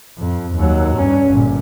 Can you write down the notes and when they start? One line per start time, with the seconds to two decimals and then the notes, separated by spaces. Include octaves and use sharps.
0.18 F2
0.56 D#2 F#3
0.96 G2 C#4
1.29 G1 A#2